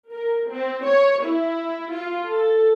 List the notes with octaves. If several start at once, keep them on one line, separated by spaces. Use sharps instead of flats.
A#4
C4
C#5
E4
F4
A4